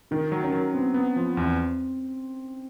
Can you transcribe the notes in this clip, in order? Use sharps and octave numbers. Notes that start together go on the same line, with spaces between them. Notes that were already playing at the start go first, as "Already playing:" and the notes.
D#3 D#4
F#3
C#4
F#3
B3 C4
B3
F3
E2 C4